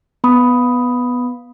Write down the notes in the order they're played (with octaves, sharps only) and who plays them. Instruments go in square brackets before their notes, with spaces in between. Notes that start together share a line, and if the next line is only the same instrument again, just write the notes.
[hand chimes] B3 B5 D#6